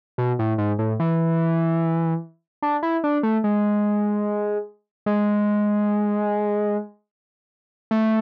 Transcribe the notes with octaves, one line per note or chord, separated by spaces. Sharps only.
B2
A2
G#2
A2
E3
D4
E4
D4
A3
G#3
G#3
A3